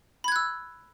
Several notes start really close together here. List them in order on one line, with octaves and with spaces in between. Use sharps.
B5 G#6 F#6 E6